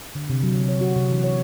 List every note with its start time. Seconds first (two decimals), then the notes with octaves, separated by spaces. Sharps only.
0.15 D3
0.30 C3
0.43 F#3
0.56 C3
0.69 C#5
0.81 F#4
0.96 C3
1.11 E3
1.24 C#5